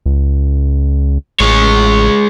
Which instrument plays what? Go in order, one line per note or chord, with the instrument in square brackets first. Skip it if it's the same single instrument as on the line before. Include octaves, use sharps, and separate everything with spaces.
[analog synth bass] C#2
[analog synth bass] A1 [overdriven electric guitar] G#3 C#5